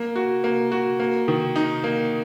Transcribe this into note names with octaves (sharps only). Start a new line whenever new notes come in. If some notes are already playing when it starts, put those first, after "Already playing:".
Already playing: A#3
F#4
A#3
F#4
A#3
D#3
D#4
A#3